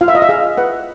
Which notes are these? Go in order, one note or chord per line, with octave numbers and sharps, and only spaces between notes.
F4 F5
E5
D#5
E5
G#4 F5
B4 F#5